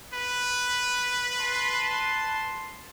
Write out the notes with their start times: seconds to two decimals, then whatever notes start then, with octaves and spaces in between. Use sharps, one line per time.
0.14 B4
1.38 A5 C6